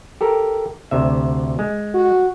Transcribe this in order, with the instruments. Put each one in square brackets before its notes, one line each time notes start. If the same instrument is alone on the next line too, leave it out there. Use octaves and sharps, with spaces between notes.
[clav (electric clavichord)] G4 A4 A#4
D2 C3 E5
G#3
[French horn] F#4